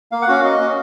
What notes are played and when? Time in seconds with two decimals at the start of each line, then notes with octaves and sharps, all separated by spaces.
0.12 A#3 F5
0.22 F#5
0.28 C#4 F#4 F5
0.44 A#3 D#5
0.60 C#4 F#4